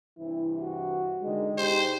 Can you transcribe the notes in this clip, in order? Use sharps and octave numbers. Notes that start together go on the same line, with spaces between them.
G2 C3 E3 E4
F#4
D3 D#3 G#3
B2 D#4 G4 C5